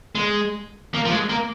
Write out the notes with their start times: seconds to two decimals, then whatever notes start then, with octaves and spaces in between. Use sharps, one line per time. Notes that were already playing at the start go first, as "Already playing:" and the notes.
0.15 G#3
0.94 A#3
1.05 F3
1.12 G#3
1.29 A#3